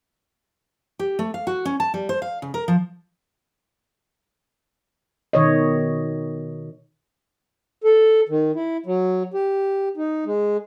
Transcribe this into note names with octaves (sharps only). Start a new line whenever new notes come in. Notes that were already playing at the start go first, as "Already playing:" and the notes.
G4
A3
F5
F#4
C#4
A5
G3
C5
F5
C#3
A#4
F3
B2 D#3 C#5 D#5
A4
D#3
E4
F#3
G4
D#4
G#3